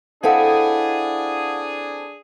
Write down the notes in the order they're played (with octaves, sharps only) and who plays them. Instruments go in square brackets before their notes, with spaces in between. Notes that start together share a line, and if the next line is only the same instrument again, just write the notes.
[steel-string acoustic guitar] C4 E4 A4 [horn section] D4 G#4 [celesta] F5 F#5